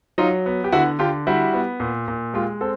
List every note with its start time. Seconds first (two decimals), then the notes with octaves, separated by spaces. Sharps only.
0.18 F#3 D#4 F4
0.46 B3
0.64 G4
0.72 D3 E4 F#4
0.99 D3 F4 G4
1.27 G3 E4 F#4
1.54 B3
1.80 A#2
2.08 A#2
2.34 G#3 F4 G4
2.61 C4 A4